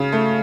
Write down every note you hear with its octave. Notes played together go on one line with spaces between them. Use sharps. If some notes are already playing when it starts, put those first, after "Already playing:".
Already playing: C#3
A3